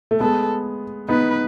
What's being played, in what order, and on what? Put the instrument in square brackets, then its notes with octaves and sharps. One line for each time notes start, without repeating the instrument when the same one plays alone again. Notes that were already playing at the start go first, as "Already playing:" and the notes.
[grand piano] A3
[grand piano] G#3 B3 [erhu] A4
[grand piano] B3 D#4 [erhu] B4